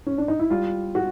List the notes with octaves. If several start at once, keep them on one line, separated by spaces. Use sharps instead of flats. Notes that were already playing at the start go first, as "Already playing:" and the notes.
C#4
D4
D#4
E4
G3 F4
F#4